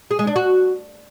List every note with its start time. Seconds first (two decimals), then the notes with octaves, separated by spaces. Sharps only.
0.11 G#4
0.19 G#3
0.27 D4
0.36 F#4